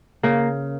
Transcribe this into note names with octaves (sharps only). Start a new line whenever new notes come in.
C#3 A#3